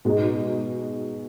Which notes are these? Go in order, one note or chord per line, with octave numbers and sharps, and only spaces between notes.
B2 G#3 D#4